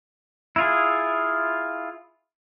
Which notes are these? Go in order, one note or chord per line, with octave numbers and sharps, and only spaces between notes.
E4 F4 G#4